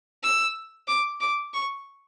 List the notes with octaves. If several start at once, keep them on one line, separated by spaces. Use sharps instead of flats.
E6
D6
D6
C#6